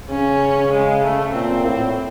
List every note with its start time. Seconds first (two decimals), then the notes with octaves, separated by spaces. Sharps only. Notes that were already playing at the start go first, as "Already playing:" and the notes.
0.10 C#3 C#4
0.73 G#3
1.03 A3
1.34 A#2 C4
1.65 A2